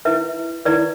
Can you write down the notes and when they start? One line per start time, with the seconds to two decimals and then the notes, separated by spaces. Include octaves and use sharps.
0.05 E4 B4 E5
0.65 E4 B4 D5